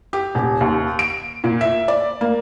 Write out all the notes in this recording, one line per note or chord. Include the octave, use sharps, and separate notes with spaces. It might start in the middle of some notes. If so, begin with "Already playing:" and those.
G4
D#1
D#2
D7
A#2
E5
D5
A#3